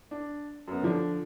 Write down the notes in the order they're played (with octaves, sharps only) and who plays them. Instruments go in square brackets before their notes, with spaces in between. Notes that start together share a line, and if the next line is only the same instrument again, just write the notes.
[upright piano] D4
F#2 B3
D3 F3 D4